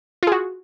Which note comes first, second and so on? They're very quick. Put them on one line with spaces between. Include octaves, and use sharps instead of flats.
F4 G#4 F#4